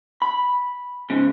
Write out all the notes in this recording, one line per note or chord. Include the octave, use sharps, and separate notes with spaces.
B5
G#2 C#3